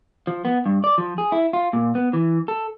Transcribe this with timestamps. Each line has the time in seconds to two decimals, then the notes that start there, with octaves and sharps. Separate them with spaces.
0.27 F3
0.45 B3
0.66 G2
0.84 D5
0.98 F3
1.18 G#4
1.32 E4
1.53 F4
1.73 A#2
1.95 B3
2.13 E3
2.48 A4